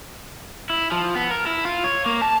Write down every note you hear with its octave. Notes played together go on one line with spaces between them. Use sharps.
E4
F3
B3
A#4
E4
F4
C#5
A#3
A5